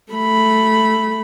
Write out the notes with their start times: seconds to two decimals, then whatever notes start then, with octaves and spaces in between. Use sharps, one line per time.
0.13 A3 B5